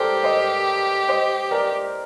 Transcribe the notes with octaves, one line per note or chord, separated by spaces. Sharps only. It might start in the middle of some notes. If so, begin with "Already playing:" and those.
Already playing: G4 A4 A#4 C5 D5
C5 D#5
C5 D#5
A#4 D5